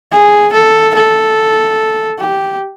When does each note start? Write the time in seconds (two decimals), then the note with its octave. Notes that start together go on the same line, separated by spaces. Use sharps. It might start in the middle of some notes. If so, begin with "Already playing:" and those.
0.12 G#4
0.53 A4
0.95 A4
2.19 G4